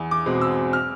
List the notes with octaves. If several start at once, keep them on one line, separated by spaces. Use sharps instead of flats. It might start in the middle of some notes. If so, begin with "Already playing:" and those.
Already playing: E2
D6
B2 G#3 C4
E6
F6